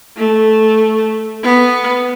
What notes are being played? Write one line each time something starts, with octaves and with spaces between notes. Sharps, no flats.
A3
B3